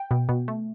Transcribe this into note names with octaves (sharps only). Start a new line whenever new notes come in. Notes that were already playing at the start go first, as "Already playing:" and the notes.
Already playing: G5
B2
B2
A3